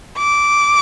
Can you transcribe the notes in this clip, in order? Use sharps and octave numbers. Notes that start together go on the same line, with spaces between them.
D6